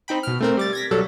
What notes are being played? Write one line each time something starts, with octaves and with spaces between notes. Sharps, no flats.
C4 D#4 G5 B5
B2 F6
A3 C4 A#4
G3 D6 A6
G#6 A#6 B6
B1 F#3 G3 A4